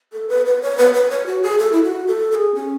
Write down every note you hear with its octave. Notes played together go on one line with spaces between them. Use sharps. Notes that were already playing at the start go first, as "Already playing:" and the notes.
A4
B4
B4
C#5
B4
B4
C#5
F#4
G#4
A4
E4
F#4
A4
A4
G#4
C#4